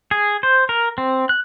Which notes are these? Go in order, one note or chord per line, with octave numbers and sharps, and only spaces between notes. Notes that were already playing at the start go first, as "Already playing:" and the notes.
G#4
C5
A#4
C4
F#6